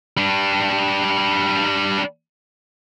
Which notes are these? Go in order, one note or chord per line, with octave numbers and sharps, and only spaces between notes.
G3 D4